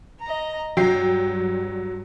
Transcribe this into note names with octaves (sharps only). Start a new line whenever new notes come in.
D#5 A#5
G2 F#3 G5 C7